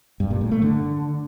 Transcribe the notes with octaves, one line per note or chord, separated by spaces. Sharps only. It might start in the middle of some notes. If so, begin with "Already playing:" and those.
G2
A#2
A2
A3
D3